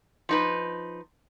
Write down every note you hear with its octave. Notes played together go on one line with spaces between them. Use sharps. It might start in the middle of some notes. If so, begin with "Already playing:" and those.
F3 D#4 B4